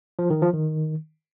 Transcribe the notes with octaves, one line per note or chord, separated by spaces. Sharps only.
F3
D#3
F3
D#3